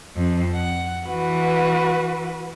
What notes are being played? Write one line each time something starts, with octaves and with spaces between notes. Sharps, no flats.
F2
F#5
E3 F#4 B4